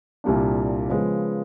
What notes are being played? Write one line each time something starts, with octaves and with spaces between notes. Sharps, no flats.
C2 A#2 G3 A#3 D4
C#3 F3 G#3 B3